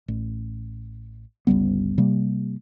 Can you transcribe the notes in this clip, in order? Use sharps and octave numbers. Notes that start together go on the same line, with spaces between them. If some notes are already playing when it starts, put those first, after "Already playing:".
A1
G1 C#2 G3 B3
C3 G3 A#3